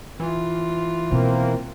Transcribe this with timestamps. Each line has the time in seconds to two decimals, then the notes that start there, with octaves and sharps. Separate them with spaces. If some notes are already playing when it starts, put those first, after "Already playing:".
0.20 E3 F4
1.11 B2 A#3 C4